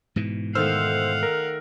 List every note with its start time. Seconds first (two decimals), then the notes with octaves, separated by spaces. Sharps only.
0.16 G#2 B2 E3
0.55 D#3 A3 C5 F5 F#5 E6 F6
1.23 A#4